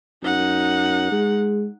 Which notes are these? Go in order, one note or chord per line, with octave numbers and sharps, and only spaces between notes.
F#2 D#4 F#5
G#3